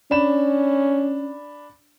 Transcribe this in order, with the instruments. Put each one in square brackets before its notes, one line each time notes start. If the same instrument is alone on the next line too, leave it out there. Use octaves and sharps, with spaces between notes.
[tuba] C#4 [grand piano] D4 B5 E7